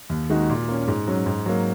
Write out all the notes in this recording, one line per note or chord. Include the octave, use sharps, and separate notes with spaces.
D#2
D#3 G#3 D#4 F#4
A#2
A#3 C#4
G#2
F#3 C#4
G#2
F#3 A#3